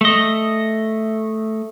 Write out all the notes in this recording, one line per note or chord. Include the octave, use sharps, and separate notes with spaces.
A3 D#5